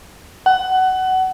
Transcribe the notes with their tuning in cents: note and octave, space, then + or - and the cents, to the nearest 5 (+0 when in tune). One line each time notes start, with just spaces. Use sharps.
F#5 +20